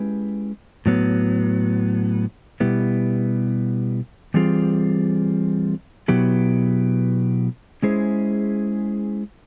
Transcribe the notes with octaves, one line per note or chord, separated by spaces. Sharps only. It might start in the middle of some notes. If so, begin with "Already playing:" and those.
Already playing: G#3 C#4 E4 G4 B4
A2 F#3 B3
B2 G3 B3 E4 G4
E3 G3 C4 F4 G#4
B2 F#3 B3 E4 G4
G#3 C#4 E4 G#4 C5